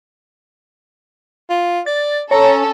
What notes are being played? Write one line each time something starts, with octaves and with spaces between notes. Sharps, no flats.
F4
D5 A6
C#4 A4 C#5 A#5